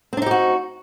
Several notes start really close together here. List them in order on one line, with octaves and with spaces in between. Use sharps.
C4 D4 D#4 G4 F#4